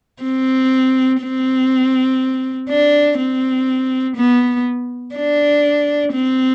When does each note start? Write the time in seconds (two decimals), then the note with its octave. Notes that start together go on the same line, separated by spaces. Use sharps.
0.23 C4
1.21 C4
2.69 D4
3.18 C4
4.17 B3
5.16 D4
6.13 C4